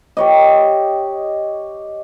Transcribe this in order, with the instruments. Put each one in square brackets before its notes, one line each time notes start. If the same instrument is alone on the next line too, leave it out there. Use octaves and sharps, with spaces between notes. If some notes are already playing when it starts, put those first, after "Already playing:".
[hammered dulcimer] G4 C#5 D#5